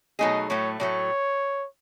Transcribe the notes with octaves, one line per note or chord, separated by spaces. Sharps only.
B2 F#3 A3 D#4 G#4 D#5
A2 F#3 A3 C#5
A2 F#3 A3 C#5